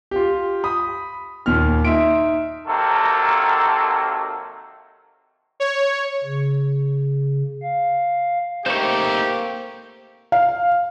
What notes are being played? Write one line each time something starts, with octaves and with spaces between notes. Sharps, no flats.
F4 G4
B5 D#6
D#2 A#2 F6
D#4 E5 C6 D7
C3 D#3 F#3 A#3 A4
C#5
C#3
F5
A3 A#3 C4 D#4 G4 C5 C#6
F5